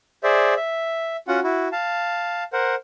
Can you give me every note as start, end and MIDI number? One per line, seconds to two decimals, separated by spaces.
0.23 0.54 68
0.23 0.54 72
0.23 0.54 74
0.23 0.54 76
0.56 1.17 76
1.28 1.40 61
1.28 1.40 65
1.28 1.40 66
1.28 1.40 78
1.44 1.68 64
1.44 1.68 66
1.72 2.44 77
1.72 2.44 81
2.53 2.75 70
2.53 2.75 72
2.53 2.75 78